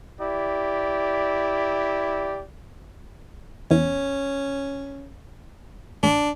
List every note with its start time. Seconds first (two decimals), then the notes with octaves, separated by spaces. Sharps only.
0.21 E4 G4 D5
3.71 E2 C#4
6.03 A1 D4